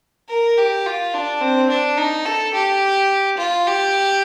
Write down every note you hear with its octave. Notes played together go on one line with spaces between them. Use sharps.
A#4
G4
F4
D4
C4
D4
D#4
A4
G4
F4
G4